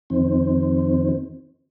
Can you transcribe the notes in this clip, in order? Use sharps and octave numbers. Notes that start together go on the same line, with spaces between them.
F2 D#3 C4